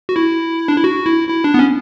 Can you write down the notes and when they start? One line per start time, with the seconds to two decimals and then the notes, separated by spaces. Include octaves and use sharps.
0.09 F#4
0.16 E4
0.68 D4
0.76 E4
0.84 F#4
1.06 E4
1.29 E4
1.44 D4
1.54 B3
1.59 C#4